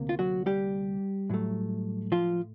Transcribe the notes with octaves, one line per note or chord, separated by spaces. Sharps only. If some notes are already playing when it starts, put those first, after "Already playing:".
Already playing: D2 C3 A#3
F4
F#3 F#4
G3 G4
A2 F#3 A3
F3 F4